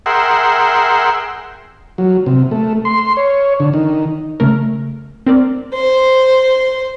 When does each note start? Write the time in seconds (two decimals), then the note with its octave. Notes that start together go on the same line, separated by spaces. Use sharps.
0.06 G#4 A#4 E5 F#5 G5 C6
1.98 F#3
2.26 C3
2.51 A3
2.85 C6
3.17 C#5
3.60 D3
3.74 D#3
4.40 C#3 A3 A#4
5.26 C4 A#4 D5
5.74 C5